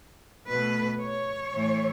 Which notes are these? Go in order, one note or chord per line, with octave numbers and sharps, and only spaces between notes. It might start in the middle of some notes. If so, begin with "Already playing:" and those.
B2 A3 B4
C#5
A2 E3 A3